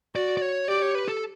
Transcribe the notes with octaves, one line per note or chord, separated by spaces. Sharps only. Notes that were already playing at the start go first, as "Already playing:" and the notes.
F#4 D5
D5
C#5
G4 D5
C#5
B4
A4